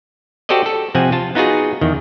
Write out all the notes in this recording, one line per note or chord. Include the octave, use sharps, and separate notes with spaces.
F#4 G4 A4 C5 D5 D#5
A4
C3 F3 C4 F#5 G#5
F4 A5
B3 D#4 F4 F#4 G#4
E2 D#3